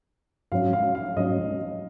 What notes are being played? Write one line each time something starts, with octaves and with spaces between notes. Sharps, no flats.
G#2 F#3 C#4 F5
F5
F5
G#2 F#3 C#4 D#5